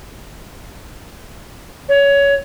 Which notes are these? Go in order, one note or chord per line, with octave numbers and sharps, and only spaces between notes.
C#5